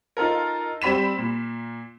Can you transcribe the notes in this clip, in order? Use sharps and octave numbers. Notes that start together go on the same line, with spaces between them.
D#4 F4 A4 A#4
G3 C4 B5 B6 E7
A#2